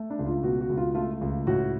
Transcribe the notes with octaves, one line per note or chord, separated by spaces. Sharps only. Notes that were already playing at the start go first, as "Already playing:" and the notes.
Already playing: A3
D4
C#2
F4
B2 F#4
F#4
C#2
F4
A3 F4
C#2
A2 F#4